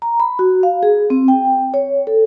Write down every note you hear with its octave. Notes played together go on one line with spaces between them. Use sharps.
A#5
B5
F#4
F5
G#4
C4
G5
C#5
A4